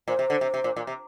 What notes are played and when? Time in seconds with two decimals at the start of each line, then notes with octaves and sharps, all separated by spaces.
0.08 A#2 C5
0.19 C3
0.30 D3
0.41 C3
0.54 C3
0.64 A#2
0.77 A#2
0.87 C3